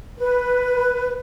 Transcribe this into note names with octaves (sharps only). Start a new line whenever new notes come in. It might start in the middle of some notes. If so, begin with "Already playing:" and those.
B4